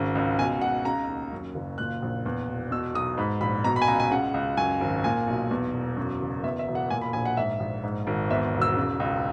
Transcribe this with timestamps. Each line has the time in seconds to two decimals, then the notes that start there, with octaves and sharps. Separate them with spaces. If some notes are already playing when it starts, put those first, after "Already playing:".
Already playing: G#1 C#3
0.15 C#2
0.38 B2 G#5
0.61 C#2 F#5
0.85 C#3 A#5
1.08 D#2
1.32 F#2
1.55 F#1
1.78 A#2 F#6
2.02 A#1
2.26 E2
2.49 E1
2.71 B2 E6
2.94 B1 D#6
3.17 G#2 B5
3.41 A#1 B5
3.64 B2 A#5
3.76 B5
3.82 G#5
3.87 C#2 A#5
4.00 G#5
4.11 C#3 F#5
4.34 C#2
4.57 F#2 G#5
4.81 G#1
5.04 A#2 G#5
5.27 B1
5.51 E2
5.74 E1
5.97 F#2
6.21 F#1
6.44 E2 E5
6.59 E5
6.68 E1
6.75 F#5
6.90 A#2 G#5
7.02 B5
7.13 A#1 G#5
7.25 F#5
7.37 G#2 E5
7.60 A#1
7.83 G#2
8.07 G#1
8.30 E2 E5
8.54 E1
8.62 E6
8.76 C#3
9.00 C#2